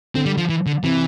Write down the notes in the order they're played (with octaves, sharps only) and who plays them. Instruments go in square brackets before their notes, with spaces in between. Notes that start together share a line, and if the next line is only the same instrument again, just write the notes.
[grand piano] D3 [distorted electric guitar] C4
[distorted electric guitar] G3
F3
E3
D3
[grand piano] C3 [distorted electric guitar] E3